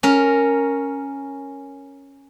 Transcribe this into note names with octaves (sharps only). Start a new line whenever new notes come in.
C#4 A#4